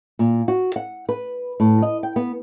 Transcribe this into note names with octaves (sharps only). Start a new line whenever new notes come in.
A#2
F#4
F#5
B4
A2
D#5
G5
B3